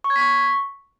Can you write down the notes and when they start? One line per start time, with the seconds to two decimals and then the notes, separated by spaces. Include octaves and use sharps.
0.04 C#6
0.10 G#6
0.16 B6
0.21 C#6